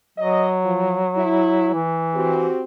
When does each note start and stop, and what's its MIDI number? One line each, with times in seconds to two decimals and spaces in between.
0.18 1.72 54
0.18 0.50 75
0.64 0.97 53
1.17 1.80 64
1.74 2.47 52
2.14 2.64 60
2.14 2.64 66
2.14 2.64 67